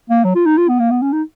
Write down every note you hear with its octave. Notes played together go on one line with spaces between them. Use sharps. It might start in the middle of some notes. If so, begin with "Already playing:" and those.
A#3
F#3
F4
D#4
F4
B3
A#3
B3
C#4
D#4